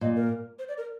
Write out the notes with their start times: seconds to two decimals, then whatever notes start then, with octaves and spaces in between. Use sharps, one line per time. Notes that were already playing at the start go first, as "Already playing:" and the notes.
0.01 A#2 D#5
0.16 A#4
0.59 C5
0.69 D5
0.78 A#4